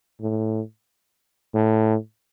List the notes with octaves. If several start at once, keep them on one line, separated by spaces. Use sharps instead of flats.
A2
A2